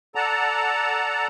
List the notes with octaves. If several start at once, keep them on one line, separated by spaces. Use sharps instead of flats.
A4 D5 F#5 A5 A#5